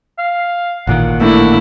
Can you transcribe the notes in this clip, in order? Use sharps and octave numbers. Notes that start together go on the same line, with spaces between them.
F5
A1 A#2 D#3 F#5
A3 A#3 D4 E4